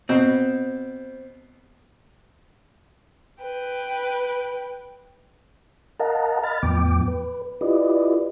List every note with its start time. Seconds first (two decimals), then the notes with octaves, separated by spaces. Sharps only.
0.09 B2 C4
3.41 B4 G5
6.00 A#4 D#5 F5 F#5 A5 A#5
6.43 D#5 B5 F6 A6
6.63 E2 A2 F3 B3 G5 D6
7.08 B4
7.61 E4 F4 G4 B4 D5 D#5